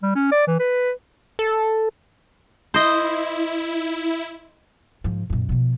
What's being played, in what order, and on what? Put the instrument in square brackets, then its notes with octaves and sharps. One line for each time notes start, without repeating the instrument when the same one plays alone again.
[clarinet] G3
C#4
D5
E3
B4
[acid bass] A4
[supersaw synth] E4 [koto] C5 D#5
[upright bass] G#2 F3
F#2 A#2
B2 F3